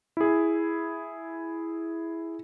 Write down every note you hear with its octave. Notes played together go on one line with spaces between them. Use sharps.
E4 G#4